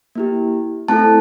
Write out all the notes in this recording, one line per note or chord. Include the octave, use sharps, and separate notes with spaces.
A#3 E4 G4
A3 C4 E4 A4 A5